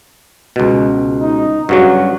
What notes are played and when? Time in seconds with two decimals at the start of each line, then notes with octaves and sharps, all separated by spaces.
0.56 C#2 B2
1.21 D#4
1.69 G2 C#3 F#3 F#4